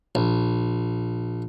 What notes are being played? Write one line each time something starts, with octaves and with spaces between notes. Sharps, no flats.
A#1